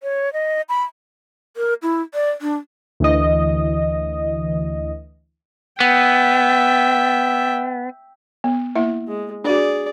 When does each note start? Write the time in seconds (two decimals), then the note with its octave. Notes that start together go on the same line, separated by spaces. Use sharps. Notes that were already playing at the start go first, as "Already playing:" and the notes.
0.03 C#5
0.33 D#5
0.69 B5
1.57 A#4
1.82 E4
2.14 D5
2.41 D4
3.00 D2 E3 D#5
5.80 B3 E5 G5
8.44 B3
8.76 A#3 E4 E5
9.07 G#3
9.44 D4 F#4 G#4 D5